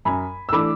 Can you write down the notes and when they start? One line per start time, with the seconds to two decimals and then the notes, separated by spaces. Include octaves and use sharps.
0.05 F#2 G#5 B5
0.49 E6
0.52 E3 A3 D4 B5 D6